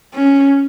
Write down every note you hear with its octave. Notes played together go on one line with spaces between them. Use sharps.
C#4